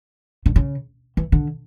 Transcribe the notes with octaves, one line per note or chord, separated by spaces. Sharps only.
D3
C#3
E3
D3